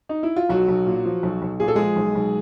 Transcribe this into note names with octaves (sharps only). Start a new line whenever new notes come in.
D#4
E4
F4
B1 F#3 F#4
B1
A#2
F3
B1
B1
A#2 G#4
A4
F3 G#3 G#4
B1
B1